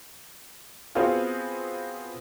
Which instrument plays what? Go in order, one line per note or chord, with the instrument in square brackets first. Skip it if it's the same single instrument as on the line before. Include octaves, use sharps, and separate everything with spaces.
[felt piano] B3 C4 F4 F#4 G#4 F5